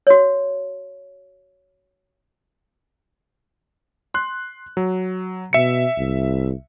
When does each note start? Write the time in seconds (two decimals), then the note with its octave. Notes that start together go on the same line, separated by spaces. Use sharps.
0.07 F#4 C#5
4.14 C6 F#6
4.77 F#3
5.53 B2 E5 C#7
5.99 C2